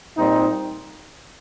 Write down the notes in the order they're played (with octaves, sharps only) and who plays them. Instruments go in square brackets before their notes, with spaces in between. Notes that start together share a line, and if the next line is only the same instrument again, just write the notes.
[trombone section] A#2 G3 C4 D#4